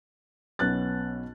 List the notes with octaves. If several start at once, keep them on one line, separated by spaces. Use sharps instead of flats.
B1 B3 C#4 F#6 A6